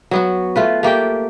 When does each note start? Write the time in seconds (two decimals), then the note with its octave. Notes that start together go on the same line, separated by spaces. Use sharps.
0.11 F#3 B3 F#4
0.56 A3 F4 B4
0.83 A3 A#3 G4 G5